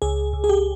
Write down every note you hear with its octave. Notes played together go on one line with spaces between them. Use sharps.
C#2 G#4
C#2
G#4
G4